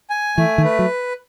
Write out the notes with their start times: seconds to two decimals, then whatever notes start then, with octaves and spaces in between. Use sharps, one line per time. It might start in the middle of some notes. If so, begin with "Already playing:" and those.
0.10 G#5
0.37 E3 A3
0.58 D#3
0.64 B4
0.79 F#3